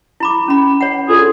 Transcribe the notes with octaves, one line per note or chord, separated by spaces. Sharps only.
E4 B5 D6
C#4 B5
C#5 F#5
D2 F4 G#4